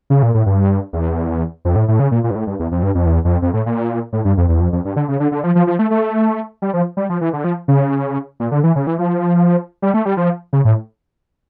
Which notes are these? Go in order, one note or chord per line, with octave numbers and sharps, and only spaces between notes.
C#3
A#2
A2
G2
E2
F2
A2
A2
C#3
A#2
A#2
G2
A2
G2
E2
F2
G2
F2
E2
F2
F2
A2
A#2
A2
G2
F2
E2
F2
F2
G2
D3
C#3
D3
D3
F3
F3
F3
A3
A3
G3
F3
G3
F3
E3
D3
F3
C#3
A#2
D3
E3
C#3
E3
F3
G3
A3
G3
F3
C#3
A2